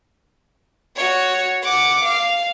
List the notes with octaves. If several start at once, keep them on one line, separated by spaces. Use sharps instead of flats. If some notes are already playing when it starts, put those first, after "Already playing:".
F#4 C#5
F#5 D6
F5